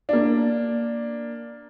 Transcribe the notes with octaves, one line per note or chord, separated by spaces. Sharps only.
A#3 D4